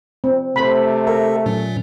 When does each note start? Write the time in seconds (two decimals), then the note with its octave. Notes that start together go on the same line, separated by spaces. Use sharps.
0.24 C4
0.56 C3 A3 C5 B5
1.07 A4 A#4 E5
1.46 A#2 F#3 C#4